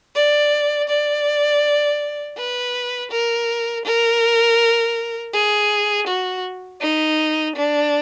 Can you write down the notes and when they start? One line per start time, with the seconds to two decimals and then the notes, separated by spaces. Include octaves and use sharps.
0.15 D5
0.89 D5
2.37 B4
3.11 A#4
3.85 A#4
5.33 G#4
6.07 F#4
6.81 D#4
7.56 D4